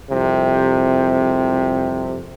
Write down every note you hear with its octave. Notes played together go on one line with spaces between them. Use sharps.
C2 F2 C3